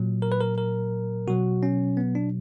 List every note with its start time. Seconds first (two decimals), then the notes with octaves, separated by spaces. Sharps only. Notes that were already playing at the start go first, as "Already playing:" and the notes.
Already playing: A#2 F#3
0.22 A#4
0.32 B4
0.41 A#4
0.58 A#4
1.27 B2 F#3 F#4
1.63 C#4
1.97 B3
2.15 D4